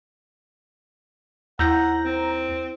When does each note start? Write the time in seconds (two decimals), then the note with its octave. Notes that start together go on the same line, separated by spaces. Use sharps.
1.59 D#2 E4 F#5 A#5 G6 A#6
2.05 C4